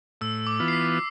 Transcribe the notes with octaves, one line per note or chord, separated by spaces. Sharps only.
A2 E6
D6
E3 B3 F4
C7
B6